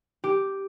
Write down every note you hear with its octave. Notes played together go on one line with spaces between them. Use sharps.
G4